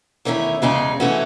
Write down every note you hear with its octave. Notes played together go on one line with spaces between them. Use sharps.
E2 D#3 A3 C#4 E4
E2 C#3 G#3 D#4 G#4
E3 A3 C#4 F#4